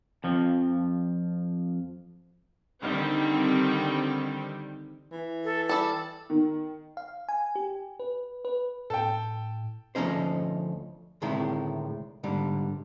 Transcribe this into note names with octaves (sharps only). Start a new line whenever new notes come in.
F2 F3
D3 D#3 G3 C4
E3
A4
G3 A4 E6
D#3
F5
G#5
G4
B4
B4
A2 A4 G5
D2 F3 A3 C#4 D#4 C5
D2 A2 C3 D#3 G#3 E4
G#2 D3 G3